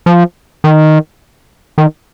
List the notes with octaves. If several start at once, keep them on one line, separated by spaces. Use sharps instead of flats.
F3
D#3
D#3